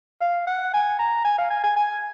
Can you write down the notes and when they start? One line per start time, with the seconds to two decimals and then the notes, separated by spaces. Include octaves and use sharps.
0.21 F5
0.47 F#5
0.73 G#5
0.99 A#5
1.24 G#5
1.38 F5
1.50 G#5
1.64 G#5
1.76 G#5